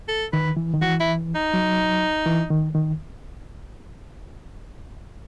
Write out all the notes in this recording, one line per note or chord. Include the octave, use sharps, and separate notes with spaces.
A4
D#3 B4
E3
D#3
E3 F#4
E4
D#4
F#3
E3
D#3
D#3